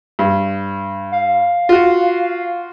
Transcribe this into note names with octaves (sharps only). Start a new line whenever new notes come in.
G2
F5
F4 F#4